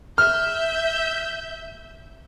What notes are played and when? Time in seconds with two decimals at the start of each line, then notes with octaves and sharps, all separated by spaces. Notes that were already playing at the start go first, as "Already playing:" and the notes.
0.18 E5 F6 G6